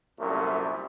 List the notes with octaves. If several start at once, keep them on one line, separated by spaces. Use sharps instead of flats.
C2 F#2 A#2 A3